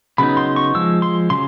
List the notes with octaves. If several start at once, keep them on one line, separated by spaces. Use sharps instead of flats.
C#3 F#3 B3 D#4 B5
C6
C#6
F3 G#3 E6
C6
C#3 F#3 C6